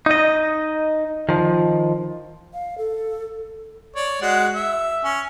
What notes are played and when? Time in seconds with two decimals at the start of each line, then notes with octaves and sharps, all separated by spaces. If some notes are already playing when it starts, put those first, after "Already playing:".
0.06 D#4 D#5
1.29 D#3 F3
2.53 F5
2.78 A4
3.96 C#5 D5
4.22 G#3 F#4 F#5
4.54 E5
5.04 C#4